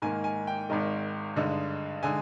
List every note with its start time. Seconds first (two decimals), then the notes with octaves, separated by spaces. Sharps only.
0.02 G#2 D#3 A#3 G#5
0.24 G#5
0.47 G5
0.69 G#1 G#2 D#3 G#3
1.36 G2 D3 G#3 D#4
2.03 D3 G#3 D#4 G#5